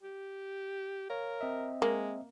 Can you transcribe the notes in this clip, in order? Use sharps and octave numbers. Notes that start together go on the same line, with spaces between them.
G4
A#4 C#5 F5
C4 D#5 E5
G#3 A#3